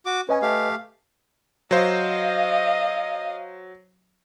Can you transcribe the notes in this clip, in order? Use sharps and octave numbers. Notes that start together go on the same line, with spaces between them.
F#4 D6
C#4 B4 D#5 G#5
A3 G4 F5
F#3 C5 D#5 F5